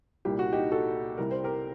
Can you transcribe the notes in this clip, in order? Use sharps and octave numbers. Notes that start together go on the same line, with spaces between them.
C2 A#2 G3 G4
F#4
D#4 G4
F#4 A4
C2 C3 G3 A#4
C5
G4 A#4